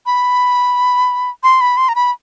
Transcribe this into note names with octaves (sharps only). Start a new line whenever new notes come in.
B5
C6
B5
C6
A#5
B5